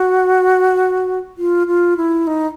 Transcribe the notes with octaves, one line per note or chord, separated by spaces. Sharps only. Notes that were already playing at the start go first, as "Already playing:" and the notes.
Already playing: F#4
F4
F4
E4
D#4